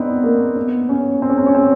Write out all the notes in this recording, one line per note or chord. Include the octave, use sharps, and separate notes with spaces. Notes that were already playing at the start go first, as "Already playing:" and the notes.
Already playing: B3 C4 D4 D#4
A#3
B3
C#4
C4
C#4
C4
C#4
C4